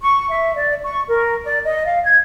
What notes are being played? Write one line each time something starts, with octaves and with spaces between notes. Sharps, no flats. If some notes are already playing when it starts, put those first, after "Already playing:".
C#6
E5
D5
C#6
A#4
D5
D#5
F5
G#6